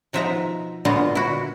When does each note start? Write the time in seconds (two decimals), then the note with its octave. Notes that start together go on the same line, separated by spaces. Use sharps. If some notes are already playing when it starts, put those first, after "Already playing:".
0.13 B2 F3 D#4 E5 F#5 A#5
0.85 A#2 D3 B3 F4 F#4 D#5
1.15 E4 F#4